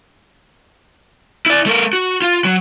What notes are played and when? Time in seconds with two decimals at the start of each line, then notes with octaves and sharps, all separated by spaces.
1.46 E4 D5
1.66 A3 A#4
1.93 F#4
2.22 F4
2.45 F#3